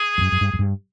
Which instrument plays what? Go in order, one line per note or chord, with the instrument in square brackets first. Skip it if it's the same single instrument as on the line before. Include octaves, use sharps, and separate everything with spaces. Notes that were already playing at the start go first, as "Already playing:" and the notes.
Already playing: [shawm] G#4
[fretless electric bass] F2
F#2
F#2
G2
F#2
G2